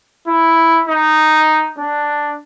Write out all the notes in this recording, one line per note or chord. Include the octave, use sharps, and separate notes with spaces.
E4
D#4
D4